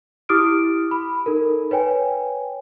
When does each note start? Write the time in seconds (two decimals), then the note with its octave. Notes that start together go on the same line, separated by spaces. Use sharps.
0.29 E4 G4 D6 D#6 F6 D7
0.91 B5
1.26 D#4 A4 A#4
1.71 B4 C#5 G5 G#5